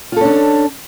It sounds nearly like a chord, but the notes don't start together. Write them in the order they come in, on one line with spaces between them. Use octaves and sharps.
F4 A4 C#4 D4